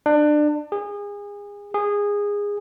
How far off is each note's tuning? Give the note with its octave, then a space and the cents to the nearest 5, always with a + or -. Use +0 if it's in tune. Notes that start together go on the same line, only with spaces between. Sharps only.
D4 +25
G#4 -30
G#4 -20